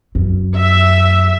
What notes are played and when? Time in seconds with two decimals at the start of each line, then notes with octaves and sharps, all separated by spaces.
0.15 F#2
0.57 E5